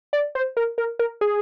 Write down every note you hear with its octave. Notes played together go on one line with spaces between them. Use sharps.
D5
C5
A#4
A#4
A#4
G#4